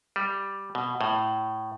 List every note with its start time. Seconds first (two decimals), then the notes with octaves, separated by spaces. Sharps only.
0.16 G3
0.75 B2
1.01 A2